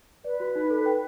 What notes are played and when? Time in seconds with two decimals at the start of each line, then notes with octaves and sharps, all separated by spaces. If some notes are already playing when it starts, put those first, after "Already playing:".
0.25 B4 D5
0.40 F#4
0.55 D#4
0.70 A4
0.86 G5